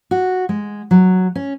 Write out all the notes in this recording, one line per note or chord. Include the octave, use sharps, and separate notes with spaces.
F#4
G#3
F#3
C#4